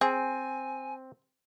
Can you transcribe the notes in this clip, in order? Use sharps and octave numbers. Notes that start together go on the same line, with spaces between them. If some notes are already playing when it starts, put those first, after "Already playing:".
C4 G#4 G#5